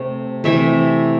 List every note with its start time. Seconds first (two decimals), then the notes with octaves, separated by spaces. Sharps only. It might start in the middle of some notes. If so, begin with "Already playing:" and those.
Already playing: C3 A3
0.44 C3 E3 A3 E5